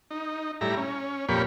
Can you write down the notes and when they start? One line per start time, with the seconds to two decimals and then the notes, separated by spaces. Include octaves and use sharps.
0.11 D#4
0.61 A2 G3 E4 A#5
0.77 C#4
1.28 F2 A#2 A#3 G4 C#5 B5